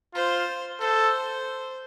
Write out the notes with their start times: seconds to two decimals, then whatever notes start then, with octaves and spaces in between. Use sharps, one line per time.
0.14 F4 C5
0.81 A4 C5